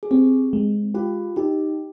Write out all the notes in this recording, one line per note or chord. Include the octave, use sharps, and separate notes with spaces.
G#4
C4 G4
G#3
F4 G4
D#4 G4